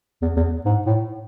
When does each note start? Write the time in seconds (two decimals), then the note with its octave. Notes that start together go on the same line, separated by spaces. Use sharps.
0.22 E2
0.36 E2
0.65 G#2
0.86 A2